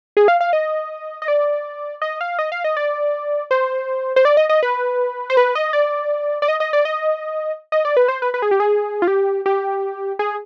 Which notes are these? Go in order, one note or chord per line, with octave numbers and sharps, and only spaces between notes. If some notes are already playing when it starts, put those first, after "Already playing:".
G#4
F5
F5
D#5
D#5
D5
D#5
F5
D#5
F5
D#5
D5
C5
C5
D5
D#5
D#5
B4
C5
B4
D#5
D5
D5
D#5
D#5
D5
D#5
D#5
D5
B4
C5
B4
B4
G#4
G4
G#4
F4
G4
G4
G#4